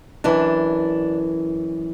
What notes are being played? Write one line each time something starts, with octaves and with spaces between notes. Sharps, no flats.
F#2 E3 D4